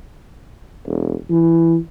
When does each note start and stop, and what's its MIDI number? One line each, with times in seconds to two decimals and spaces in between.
0.86 1.14 28
1.30 1.77 52